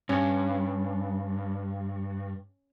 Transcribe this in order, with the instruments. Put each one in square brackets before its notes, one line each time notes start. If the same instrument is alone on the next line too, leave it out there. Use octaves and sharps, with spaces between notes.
[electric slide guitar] G2 [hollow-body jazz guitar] C#4